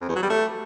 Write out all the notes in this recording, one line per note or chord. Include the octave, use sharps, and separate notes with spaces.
F2
E2
F#3
G3
A3